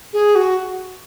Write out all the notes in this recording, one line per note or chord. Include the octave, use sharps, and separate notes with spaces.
G#4
F#4